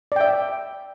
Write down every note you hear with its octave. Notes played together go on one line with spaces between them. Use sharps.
D5 E5 G5